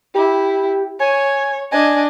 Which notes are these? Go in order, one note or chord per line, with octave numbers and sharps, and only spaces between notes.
E4 G4
C#5 G#5
D4 D#5 G#5